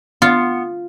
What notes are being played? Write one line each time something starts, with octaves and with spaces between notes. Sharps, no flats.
B3 F4